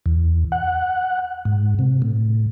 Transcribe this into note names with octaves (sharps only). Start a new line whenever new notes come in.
E2
F#5
G#2
C3
A2